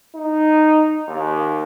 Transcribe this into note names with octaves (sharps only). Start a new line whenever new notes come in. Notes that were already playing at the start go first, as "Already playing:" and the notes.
D#4
D#2